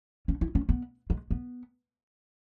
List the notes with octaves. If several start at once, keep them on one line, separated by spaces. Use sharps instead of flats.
C#4
E4
C#4
B3
G#3
B3